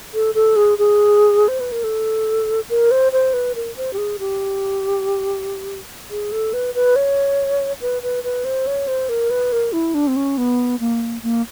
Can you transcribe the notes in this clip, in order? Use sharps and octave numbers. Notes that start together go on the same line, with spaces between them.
A4
A4
G#4
G#4
C5
B4
A#4
A4
A#4
C5
C5
B4
A#4
C5
G4
G#4
G4
G#4
A4
B4
B4
C#5
B4
B4
B4
C5
C#5
C5
A#4
B4
A#4
E4
D4
C4
C#4
B3
A#3
A#3